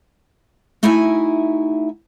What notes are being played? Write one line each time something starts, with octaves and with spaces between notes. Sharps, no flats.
A3 D#4 E4 F#4 E5 G#5